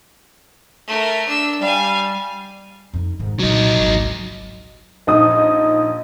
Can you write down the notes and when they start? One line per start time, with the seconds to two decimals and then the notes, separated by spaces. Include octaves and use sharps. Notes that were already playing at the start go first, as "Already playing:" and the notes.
0.87 A3 A#4
1.28 D4 E6
1.61 G3 F5 G#5
2.93 F2 D#4
3.19 G#2 D#3
3.39 C2 A#2 F#3 D#4
3.76 G#1 C#2
5.07 A#1 D#4 D#6